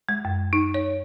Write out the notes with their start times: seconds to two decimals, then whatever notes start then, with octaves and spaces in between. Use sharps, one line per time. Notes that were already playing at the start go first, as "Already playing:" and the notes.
0.09 G#3
0.25 F#2
0.53 D#4
0.74 C#5